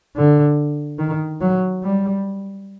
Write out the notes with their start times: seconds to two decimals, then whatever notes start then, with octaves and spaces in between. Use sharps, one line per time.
0.16 D3
0.99 D#3
1.41 F#3
1.83 G3